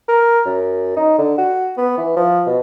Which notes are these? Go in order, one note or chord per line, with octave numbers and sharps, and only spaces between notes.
A#4
F#2
D#4
D3
F#4
B3
E3
F3
B2